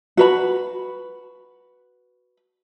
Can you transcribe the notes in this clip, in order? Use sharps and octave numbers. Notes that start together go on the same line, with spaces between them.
F#4 B4 B5